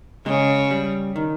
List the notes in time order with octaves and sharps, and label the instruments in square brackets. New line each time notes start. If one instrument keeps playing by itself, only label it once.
[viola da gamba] C#3 [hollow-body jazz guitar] G#3
[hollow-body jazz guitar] G3
D#3